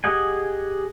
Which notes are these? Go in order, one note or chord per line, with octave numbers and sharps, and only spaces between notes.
G4 G#4 D#5 F#5 G#5